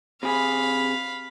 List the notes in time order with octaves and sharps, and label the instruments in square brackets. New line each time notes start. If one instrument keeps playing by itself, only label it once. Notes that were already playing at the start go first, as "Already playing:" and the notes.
[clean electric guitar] C3 G#4 [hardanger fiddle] F5 B5